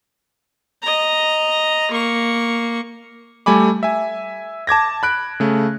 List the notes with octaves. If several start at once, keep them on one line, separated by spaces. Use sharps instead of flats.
D#5 A#5
A#3 C#6
G3 A3 G#5 B5 D6
E5 G#5
A5 D6 G#6 A#6
B5 F#6 D7
C#3 A3